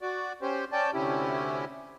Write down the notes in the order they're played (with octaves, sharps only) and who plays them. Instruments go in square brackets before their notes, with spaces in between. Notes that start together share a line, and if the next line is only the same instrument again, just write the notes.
[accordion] F#4 D5
C#4 G4 C5
C#4 D5 G5 A5
D2 C3 C#4 E4 G4